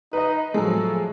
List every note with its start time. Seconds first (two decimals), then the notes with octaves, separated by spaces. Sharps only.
0.13 D#4 B4 D#5
0.54 A2 F3 F#3 G#3 A4